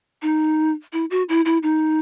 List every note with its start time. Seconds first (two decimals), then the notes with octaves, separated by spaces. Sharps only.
0.22 D#4
0.93 E4
1.11 F#4
1.29 E4
1.45 E4
1.63 D#4